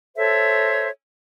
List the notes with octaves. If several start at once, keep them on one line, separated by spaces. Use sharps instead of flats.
A4 C5 C#5 E5